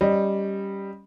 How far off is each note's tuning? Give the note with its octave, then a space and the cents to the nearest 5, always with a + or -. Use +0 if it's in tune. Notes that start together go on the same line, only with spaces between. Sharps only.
G3 +0 C#4 +0 D#5 -10